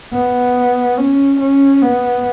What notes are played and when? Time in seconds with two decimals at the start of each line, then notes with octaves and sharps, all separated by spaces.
0.13 B3
0.98 C#4
1.40 C#4
1.82 B3